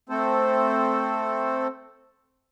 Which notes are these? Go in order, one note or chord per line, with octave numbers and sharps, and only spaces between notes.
A3 C4 A4 C5